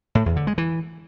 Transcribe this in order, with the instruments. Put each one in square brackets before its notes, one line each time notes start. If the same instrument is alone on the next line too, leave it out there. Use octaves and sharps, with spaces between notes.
[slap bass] A2
E2
D3
G#3
E3